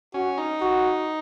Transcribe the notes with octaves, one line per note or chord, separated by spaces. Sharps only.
C#4 F#4
D#4
F#4